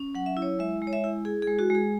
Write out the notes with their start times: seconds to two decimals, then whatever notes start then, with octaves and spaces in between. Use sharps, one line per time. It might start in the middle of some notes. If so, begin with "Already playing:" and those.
Already playing: C#4
0.15 F#3 F#5
0.26 E5
0.37 E4
0.42 C#5
0.59 G#3 E5
0.82 G#3
0.87 C#5
0.93 E5
1.04 E4
1.25 E4 G#4
1.42 G#4
1.47 G#3
1.59 F#4
1.70 G#3
1.75 G#4